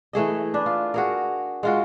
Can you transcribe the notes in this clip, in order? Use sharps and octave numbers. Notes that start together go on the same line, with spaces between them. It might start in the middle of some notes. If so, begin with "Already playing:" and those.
E3 A3 G#4 D#5
D4 B4
F4
F#4 G#4 A#4
G#3 F4 F#4